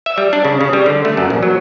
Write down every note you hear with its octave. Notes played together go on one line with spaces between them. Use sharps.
E5
G3
D4
C#3
C#3
G3
D3
A3
F#2
A#1
F#3